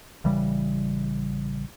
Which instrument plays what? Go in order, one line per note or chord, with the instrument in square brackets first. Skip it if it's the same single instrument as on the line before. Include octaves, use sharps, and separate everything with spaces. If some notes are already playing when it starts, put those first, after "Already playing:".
[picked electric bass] A1 C#3 E3 G3